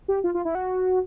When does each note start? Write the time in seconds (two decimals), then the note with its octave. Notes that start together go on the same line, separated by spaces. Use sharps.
0.08 G4
0.24 F4
0.34 F4
0.45 E4
0.55 F#4